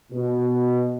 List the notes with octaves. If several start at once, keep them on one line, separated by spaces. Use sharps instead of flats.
B2